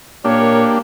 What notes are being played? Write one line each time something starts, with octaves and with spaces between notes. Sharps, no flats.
A#2 A#3 D4 G4 A#4 C#5